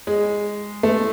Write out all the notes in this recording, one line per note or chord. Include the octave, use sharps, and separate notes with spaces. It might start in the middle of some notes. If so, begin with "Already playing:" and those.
G#3
A3